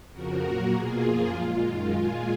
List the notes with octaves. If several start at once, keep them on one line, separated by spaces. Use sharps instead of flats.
F2 C#3 F3 F#4 A#4
A#2 F#3 A#3
B2 A#3 F4 G#4
F#2 F3 A#3
A#2 G#3 F4
F#2 D#3 G#3
A#2 G#3 F4 G#4